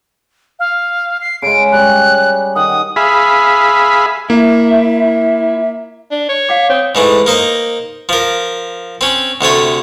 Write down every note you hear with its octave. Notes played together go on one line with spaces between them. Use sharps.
F5
C7
C#3 G#3 D7
G3 C#4 F#6
D#3 F#5 D#6
G#4 E5 F5 B5
A#3 E4 E5
D4
C#5
F5 F#5 D6
C4 C#5 D#6
G#2 E3 A3
A#3 D#4 C5
F3 A#4
C4 C#4
D2 C3 A3 C#5